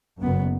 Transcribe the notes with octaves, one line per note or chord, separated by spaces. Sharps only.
F#1 F#2 B3